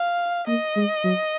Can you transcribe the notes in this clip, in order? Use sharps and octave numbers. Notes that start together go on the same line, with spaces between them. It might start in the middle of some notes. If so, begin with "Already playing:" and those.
Already playing: F5
A#3 D#5
G#3
F#3